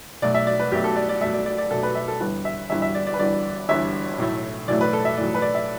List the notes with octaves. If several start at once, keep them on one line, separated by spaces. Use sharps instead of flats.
B1 B2 A3 D5
E5
D5
B4
B1 B2 A3 G4
A4
D5
D5
B1 B2 A3 E5
D5
D5
D5
B1 B2 A3 A4
B4
E5
A4
G1 G2 E3 B4
E5
G1 G2 E3 E5
E5
D5
D5
B4
G1 G2 E3 D5
G1 G2 E3 E5
B1 A2 E3 A3
B1 A2 E3 A3 D5
B4
A4
E5
B1 A2 E3 A3 D5
B4
D5
E5